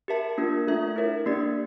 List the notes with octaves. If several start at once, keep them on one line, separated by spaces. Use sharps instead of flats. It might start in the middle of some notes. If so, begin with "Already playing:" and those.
G4 A#4 E5 A5
A#3 D4 F4 A#4
A3 D4 F4 A4 E5
E4 A#4 C#5 E5
A#3 D4 G4 D5